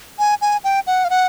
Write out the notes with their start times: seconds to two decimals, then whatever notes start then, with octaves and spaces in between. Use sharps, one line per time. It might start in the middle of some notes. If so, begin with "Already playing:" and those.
0.19 G#5
0.41 G#5
0.64 G5
0.87 F#5
1.05 F5
1.10 F#5